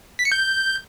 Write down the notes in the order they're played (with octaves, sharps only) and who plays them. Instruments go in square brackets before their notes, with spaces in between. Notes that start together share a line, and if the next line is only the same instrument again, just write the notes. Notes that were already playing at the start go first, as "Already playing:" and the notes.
[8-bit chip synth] B6
C#7
G6